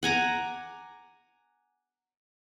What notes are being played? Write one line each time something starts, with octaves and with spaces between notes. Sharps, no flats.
F#5 G#5 A#5 D6